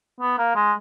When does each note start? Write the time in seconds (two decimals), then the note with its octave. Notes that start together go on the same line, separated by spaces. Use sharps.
0.20 B3
0.38 A#3
0.55 G#3